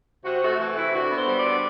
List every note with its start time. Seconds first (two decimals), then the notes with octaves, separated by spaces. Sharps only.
0.25 C3 F#4
0.42 A3 F#4
0.59 E3 F#4
0.76 C3 E4
0.93 D3 F#4
1.11 B3
1.16 C5
1.28 G3
1.39 D5
1.45 D3